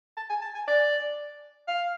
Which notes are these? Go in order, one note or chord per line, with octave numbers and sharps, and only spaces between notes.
A5
G#5
A5
G#5
D5
F5